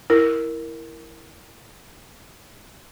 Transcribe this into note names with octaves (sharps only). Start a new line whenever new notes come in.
E4 A#4